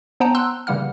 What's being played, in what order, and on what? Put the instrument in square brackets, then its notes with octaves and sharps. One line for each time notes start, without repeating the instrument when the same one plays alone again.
[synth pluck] B3 C5 F#5 G5 A5 A#5
C6 E6 F#6
C#3 E3 G3 A#3 F#5 F6